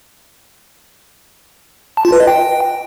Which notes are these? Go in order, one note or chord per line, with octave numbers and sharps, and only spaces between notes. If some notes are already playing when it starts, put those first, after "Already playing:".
A5
F4
B4
D#5
G5